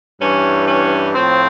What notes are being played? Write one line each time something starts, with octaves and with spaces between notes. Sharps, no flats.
G2 E3 C#4
C#4
A2 F3 C4